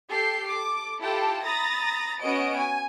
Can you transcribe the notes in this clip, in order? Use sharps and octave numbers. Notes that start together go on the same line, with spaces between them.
G4 A4 G6 C7
A4 D6
E4 F4 G4 A4 G5 A5
A#5 B5 D#6 A6 A#6
B3 C#4 F#4 D#5 D7
G#5